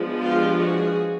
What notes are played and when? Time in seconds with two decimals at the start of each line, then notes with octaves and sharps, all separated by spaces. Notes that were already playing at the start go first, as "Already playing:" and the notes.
Already playing: F3 G#3 B3 D4
0.21 F4 G4
0.58 F#4 G#4